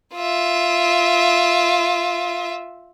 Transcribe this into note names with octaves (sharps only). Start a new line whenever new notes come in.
F4 E5